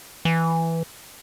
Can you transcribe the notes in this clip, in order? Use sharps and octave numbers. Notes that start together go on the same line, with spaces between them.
E3